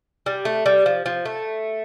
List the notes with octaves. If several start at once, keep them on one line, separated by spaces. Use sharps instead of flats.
G3
A3
G3
F3
F3
A3